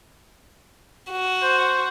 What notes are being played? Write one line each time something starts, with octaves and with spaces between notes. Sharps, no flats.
F#4
C5